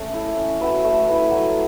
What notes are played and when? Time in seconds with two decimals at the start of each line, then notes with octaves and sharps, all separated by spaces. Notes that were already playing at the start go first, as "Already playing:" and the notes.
Already playing: A3 C#4
0.14 E4 A4
0.37 C#4
0.61 F#4 B4 E5
0.84 A3
1.07 E4 B4 E5
1.31 F#3